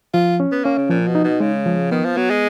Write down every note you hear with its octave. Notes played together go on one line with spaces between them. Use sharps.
F3 F4
C#4
B3
A#3 C#4
C#3
A#2 F3
B2
D#4
B2
C#3 G#3
F3
D#3 B3
F3
F#3 B3
G#3